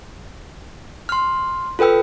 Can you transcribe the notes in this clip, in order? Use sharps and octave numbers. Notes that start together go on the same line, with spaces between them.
C6 F6
F4 A4 B4 G5 E6